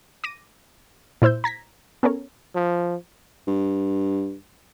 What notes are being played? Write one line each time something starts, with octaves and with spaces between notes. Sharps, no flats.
D6 A#6 D#7
A#2 E4 C5 E6 G6
A#5 G#6 A#6 B6
B3 C#4 A4 A#4 C#5
F3
G2